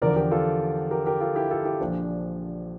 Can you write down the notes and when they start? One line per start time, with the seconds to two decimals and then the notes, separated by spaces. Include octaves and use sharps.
0.02 E2 D3 F3 A#4 D5
0.16 G4 A#4
0.31 F4 A4
0.91 G4 A#4
1.06 G4 A#4
1.21 F4 A4
1.35 E4 G4
1.51 F4 A4
1.65 E4 G4
1.80 A#1 A#2 F3 D4